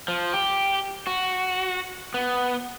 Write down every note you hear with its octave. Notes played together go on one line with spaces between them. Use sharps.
F3
G4
F#4
B3